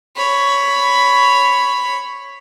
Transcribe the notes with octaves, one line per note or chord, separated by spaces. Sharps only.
C#5 B5